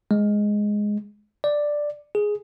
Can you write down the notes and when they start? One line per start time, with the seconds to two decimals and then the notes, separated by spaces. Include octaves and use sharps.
0.11 G#3
1.44 D5
2.15 G#4